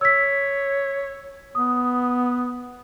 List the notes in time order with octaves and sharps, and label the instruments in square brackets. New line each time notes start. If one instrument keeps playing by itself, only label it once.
[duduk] C#5 [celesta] E6 B6
[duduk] B3 [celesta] D#6